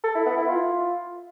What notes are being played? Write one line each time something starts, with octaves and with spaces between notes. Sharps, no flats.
A4
E4
B3
E4
F4